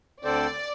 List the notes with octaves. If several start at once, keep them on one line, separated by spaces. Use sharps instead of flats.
D2 D3 C4 A4 C5 D5